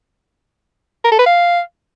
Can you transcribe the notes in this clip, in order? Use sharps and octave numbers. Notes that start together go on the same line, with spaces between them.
A#4
A4
B4
F5